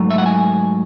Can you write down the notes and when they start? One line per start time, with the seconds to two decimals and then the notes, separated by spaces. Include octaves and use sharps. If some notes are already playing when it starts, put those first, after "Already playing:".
Already playing: G#2 F#3 A3
0.11 E5
0.18 F#5
0.26 G#5